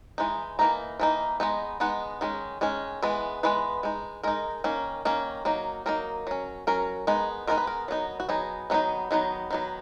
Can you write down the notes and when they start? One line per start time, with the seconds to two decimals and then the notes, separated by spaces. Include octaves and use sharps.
0.18 E3 G#3 D#4
0.59 E3 A#3 D#4 A#5
1.00 E3 A#3 D#4
1.40 G#3 B3 D#4
1.80 G#3 B3 D#4 F#5
2.21 D#3 G#3 C#4
2.61 D#3 G#3 C#4
3.02 E3 G#3 B3
3.43 E3 G#3 B3 B4
3.83 G#3 D#4
4.23 G#3 D#4 A#4
4.64 D#3 A#3 C#4
5.05 D#3 A#3 C#4
5.45 F#3 A#3 D#4
5.86 F#3 A#3 D#4 A#4
6.27 F#3 C#4
6.67 F#3 C#4 A#4
7.07 G#3 B3 D#4
7.47 G#3 B3 D#4 A#4
7.58 B4
7.67 A#4
7.88 F#3 B3 D#4
8.20 F#4
8.29 F#3 B3 D#4 G#4
8.70 D#3 F#3 B3 D#4
9.11 D#3 F#3 B3 D#4
9.51 D#3 F#3 B3